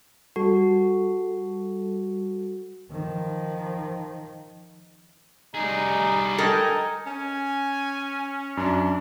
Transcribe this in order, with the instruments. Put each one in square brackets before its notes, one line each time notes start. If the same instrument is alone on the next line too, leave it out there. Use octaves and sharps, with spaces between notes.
[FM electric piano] G3 A4 [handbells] F#4
[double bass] D#3 F3
[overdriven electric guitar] G3 G#4 [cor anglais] D#4
[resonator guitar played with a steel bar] A4 A#4 [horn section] D#5 G5 G#5
[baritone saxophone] C#4 [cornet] G#5
[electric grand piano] F#2 [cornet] D4